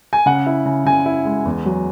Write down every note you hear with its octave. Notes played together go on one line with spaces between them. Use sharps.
G#5
C#3 F#5
E4
C#3
C#3 G#5
E4
G#3
E2
F#3